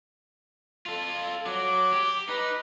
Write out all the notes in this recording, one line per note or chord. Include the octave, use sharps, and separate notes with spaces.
F4 A4
F#3 D6
G4
D#4 B4